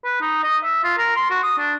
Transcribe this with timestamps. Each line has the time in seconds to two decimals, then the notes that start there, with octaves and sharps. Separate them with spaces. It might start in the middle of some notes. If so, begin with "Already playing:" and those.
0.04 B4
0.21 D#4
0.43 D#5
0.63 E5
0.84 F4
0.97 A#4
1.16 C6
1.30 F#4
1.43 D#6
1.58 D4